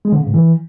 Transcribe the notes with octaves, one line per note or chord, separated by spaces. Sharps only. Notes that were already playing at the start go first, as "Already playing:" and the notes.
G#3
D3
C#3
G#2
E3